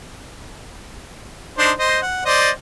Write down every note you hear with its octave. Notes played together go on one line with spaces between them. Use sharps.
D4 D#4 C5
C5 D#5
F#5
C5 D5 D#5